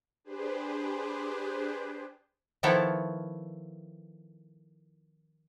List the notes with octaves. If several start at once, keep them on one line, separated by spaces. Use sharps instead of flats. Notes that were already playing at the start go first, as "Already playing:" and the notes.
D4 G4 G#4 B4 C5
D#3 F3 B3 E4 A4 C#5